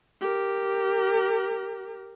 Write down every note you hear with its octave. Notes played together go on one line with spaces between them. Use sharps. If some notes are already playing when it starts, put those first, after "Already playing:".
G4 A#4